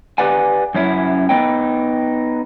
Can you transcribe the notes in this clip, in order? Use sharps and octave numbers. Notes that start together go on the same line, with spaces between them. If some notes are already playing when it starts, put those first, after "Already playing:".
G4 B4 D5 F#5 G#5
F#2 C#4 E4
B3 D#4 G5